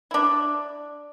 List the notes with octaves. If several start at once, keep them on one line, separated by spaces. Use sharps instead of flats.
D4 E4